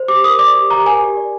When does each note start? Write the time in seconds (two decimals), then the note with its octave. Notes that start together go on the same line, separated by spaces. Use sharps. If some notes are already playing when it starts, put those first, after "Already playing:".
Already playing: C5
0.08 G4 D6
0.24 A#4 D#6
0.39 D5 D6
0.55 G4
0.70 G4 A#5
0.85 A#4 G#5
1.01 G4
1.17 D5